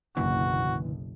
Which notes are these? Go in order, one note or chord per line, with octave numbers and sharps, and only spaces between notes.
F#1 B1 A#2 D3 E3 F#4